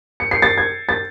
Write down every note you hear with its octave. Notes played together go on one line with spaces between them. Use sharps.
C#7
C7
A6
G#6
A6